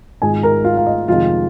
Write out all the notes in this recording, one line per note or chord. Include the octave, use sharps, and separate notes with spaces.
G#1 G#2 G#3 F4 G#4 G#5
A#4 A#5
F4 F5
F5
D#5
F2 C3 D#3 G#3 C4 F4 F5